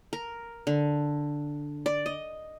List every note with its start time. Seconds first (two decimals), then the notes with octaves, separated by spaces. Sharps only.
0.13 A#4
0.67 D3
1.86 D5
2.06 D#5